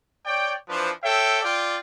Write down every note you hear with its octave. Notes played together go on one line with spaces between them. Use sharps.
C#5 D5 G5
E3 F3 D4 B4 C5
A4 C#5 E5 G5
F4 D5 G5